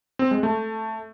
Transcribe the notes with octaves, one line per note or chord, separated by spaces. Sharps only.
C4
G#3
A3